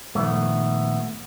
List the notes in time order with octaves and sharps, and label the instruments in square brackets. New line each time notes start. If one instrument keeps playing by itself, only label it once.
[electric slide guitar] A#2 D#3 F3 [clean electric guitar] A3 B3